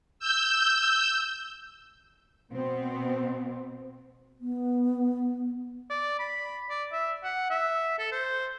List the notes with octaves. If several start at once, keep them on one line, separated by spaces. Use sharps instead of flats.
E6 G6
B2 B3 C4
B3
D5
B5
D5
E5
F#5
E5
A4
C5